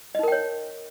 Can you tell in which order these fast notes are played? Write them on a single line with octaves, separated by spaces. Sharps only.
D#5 D#4 A#4 G5 C#5